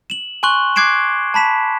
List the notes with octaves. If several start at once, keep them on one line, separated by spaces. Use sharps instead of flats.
E7 F#7
G#5 C6 C#6 F#6 F#7 G7
D6 F#6 G#6 C7 D7 E7
A5 B5 B6 E7